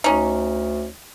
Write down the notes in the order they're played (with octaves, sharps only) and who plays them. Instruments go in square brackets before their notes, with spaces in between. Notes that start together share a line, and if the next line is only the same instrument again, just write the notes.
[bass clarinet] D2 [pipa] C#4 D#4